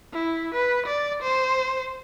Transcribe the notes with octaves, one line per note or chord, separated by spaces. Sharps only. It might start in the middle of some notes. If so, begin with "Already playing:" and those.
E4
B4
D5
C5